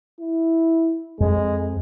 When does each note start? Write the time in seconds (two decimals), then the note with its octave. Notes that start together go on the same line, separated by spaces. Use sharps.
0.20 E4
1.20 F2 G#3